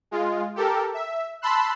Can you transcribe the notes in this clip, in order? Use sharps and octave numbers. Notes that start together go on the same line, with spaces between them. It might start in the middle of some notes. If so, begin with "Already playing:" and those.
G#3 F4
G4 A4 A#4
E5
A5 B5 C6 E6 F#6